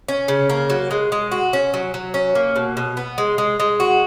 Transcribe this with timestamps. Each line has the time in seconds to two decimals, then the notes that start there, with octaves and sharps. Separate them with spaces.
0.09 C#4
0.28 C#3
0.50 A#3
0.70 F#3
0.91 G#3
1.12 G#3
1.32 F#4
1.53 C#4
1.74 F#3
1.94 F#3
2.14 C#4
2.35 A#3
2.56 B2
2.77 B2
2.97 B3
3.18 G#3
3.38 G#3
3.60 G#3
3.80 F#4